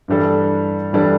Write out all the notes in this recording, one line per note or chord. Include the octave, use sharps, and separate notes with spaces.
G2 E3 G3 D4 A4
G2 E3 G3 D4 A4